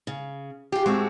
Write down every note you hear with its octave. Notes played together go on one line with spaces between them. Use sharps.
C#3
F4 G4 G#4
A2 G#3 C4 F#4